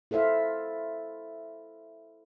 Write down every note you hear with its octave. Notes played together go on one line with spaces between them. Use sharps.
E4 A4 C5 E5 F5